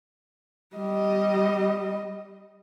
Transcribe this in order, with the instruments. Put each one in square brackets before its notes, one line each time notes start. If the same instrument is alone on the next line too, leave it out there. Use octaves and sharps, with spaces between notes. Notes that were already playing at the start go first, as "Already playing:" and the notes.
[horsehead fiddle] G3 D#5